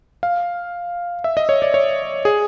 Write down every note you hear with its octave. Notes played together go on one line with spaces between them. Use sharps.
F5
E5
D#5
C#5
D5
C#5
G#4